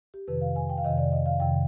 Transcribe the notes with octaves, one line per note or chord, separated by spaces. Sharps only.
G4
F2 C3 D#3 B4
F5
G#5
G5
F5
F2 C3 D#3 D#5
D5
D#5
F5
F2 C3 D#3 G5